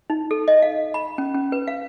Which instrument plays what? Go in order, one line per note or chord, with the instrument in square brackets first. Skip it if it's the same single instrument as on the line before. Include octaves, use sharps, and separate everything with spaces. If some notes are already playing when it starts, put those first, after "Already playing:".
[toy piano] D#4
A4
D#5
F5
B5
C#4
C#4
B4
F5